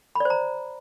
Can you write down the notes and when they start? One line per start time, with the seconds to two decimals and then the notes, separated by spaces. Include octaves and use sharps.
0.15 B5
0.20 D5
0.25 C5
0.30 A#5